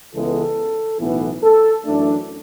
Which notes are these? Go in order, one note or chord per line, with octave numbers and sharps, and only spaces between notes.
C#2 C#3 E3 G#3 B3 A4
B1 A2 E3 B3
A4
F#2 E3 A3 D4